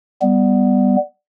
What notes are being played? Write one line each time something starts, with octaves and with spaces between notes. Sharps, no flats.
G3 B3